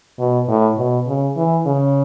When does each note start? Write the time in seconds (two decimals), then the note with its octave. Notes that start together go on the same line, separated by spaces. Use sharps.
0.19 B2
0.48 A2
0.78 B2
1.07 C#3
1.36 E3
1.66 C#3